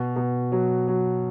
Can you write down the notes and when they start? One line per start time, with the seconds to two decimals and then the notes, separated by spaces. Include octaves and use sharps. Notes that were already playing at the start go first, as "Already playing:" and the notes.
Already playing: B2
0.16 B2
0.52 F#3
0.88 F#3